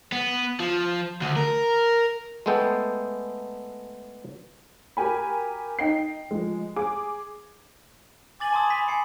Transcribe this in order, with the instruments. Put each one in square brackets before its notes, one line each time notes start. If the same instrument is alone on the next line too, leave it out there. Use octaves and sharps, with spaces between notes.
[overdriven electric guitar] B3
F3
D2
A#4
[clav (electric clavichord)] G#3 A3 B3 A4 G5
[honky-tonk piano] F#4 G4 A#4 G#5 B5
D#4 G5 C7
F3 G#3
G#4 D6
[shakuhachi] G#5 [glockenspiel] D6 A6 F#7
[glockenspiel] A5 C6 D#6
B5 B6
G#5 C7 C#7